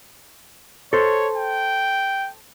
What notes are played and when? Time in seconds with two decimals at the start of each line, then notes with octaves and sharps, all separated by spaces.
0.93 A4 C5 C#5
1.36 G5